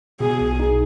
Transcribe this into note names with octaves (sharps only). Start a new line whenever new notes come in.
B2 G#4
B1
D#4